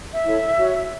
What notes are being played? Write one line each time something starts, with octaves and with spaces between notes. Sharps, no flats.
E5
E4 A4 C#5
F#4 C#5